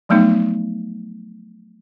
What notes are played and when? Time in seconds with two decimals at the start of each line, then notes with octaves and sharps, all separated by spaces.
0.09 F3 F#3 A3 B3 D#4